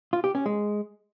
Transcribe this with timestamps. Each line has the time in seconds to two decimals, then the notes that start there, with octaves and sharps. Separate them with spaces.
0.13 F4
0.24 G4
0.35 C#4
0.46 G#3